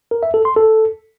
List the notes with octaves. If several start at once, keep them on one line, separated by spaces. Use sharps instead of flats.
A#4
E5
A4
C6
A4